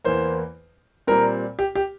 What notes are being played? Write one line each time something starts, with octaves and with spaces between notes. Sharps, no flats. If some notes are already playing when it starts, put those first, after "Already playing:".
E2 E3 A#3 C5
A#2 G3 C4 A#4
G4
G4